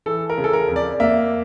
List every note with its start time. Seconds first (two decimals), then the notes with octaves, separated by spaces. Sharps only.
0.06 E3 A4
0.30 A#4
0.38 C#3
0.44 A4
0.53 A#4
0.68 F2
0.76 D5
1.00 A#3 E5